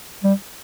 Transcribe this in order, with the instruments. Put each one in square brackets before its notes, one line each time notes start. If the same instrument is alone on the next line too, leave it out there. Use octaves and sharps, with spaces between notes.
[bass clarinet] G3